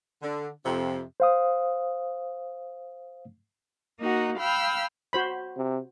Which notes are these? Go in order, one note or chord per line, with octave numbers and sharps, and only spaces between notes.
D3
F2 C3
C5 F5 D#6
A#3 D#4 F#4 F#5
F5 G5 B5 E6 F6
F#4 C5 B5
C3